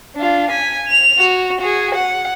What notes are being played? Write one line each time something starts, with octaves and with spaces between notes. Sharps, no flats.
D4 F4
G#5 B6
F7
F#4
F#4 G#4
F#5